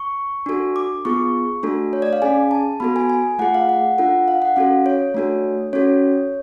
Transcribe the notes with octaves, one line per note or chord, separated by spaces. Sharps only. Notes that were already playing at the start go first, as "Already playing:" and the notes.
Already playing: C#6
D4 F#4 A4
D6
B3 F4 G#4 C#6
A3 D4 F#4 A4
C#5
D5
F5
C#4 G#4 G#5
A5
B3 F#4 A4 B5
G#5
G#5
A3 F4 G#4 F#5
F5
F#5
D4 F4 A4 F#5
F5
F#5
C#4 F#4 A4 F5
C#5
A3 D4 F#4 A4
C#4 F#4 A4 C#5